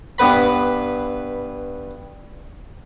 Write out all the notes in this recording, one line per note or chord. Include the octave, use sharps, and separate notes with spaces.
G2 B3 B4 B5